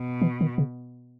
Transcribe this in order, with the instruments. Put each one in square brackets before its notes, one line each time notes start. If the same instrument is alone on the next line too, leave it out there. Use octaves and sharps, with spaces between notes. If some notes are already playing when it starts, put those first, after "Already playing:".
Already playing: [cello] B2
[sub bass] E3
D#3
C#3